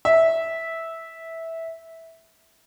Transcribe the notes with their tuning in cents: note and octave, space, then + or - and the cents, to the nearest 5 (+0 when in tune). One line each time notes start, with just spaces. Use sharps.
E5 -10